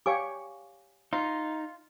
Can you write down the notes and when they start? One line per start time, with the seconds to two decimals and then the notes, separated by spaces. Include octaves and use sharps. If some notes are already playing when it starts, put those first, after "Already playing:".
0.06 G4 C#5 F5 G#5 C#6 D6
1.13 D#4 F4